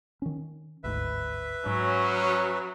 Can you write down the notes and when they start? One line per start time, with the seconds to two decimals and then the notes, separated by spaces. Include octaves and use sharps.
0.22 D#3 C#4
0.84 G1 D2 G#2 B4 E5
1.66 G#2 F#3 C#4